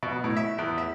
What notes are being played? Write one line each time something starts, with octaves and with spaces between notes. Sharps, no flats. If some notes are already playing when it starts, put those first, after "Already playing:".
B2
A2
E5
E2
E5